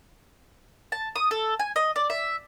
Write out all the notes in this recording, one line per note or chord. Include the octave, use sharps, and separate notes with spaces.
A5
D#6
A4
G#5
D#5
D5
E5